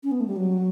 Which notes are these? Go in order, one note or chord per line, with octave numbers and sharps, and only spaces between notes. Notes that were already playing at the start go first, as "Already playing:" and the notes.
C#4
B3
A3
G3
F#3